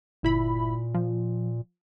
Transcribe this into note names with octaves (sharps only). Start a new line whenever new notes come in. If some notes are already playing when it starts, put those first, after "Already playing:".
G1 A#2 E4 B5
F3